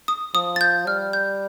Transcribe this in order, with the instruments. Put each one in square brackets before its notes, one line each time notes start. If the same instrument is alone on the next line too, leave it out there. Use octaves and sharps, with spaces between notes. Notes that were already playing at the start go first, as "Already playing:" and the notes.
[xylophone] D#6
[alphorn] F3 [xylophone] D#6
[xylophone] A6
G6
[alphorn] G3 [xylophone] F6
[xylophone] G6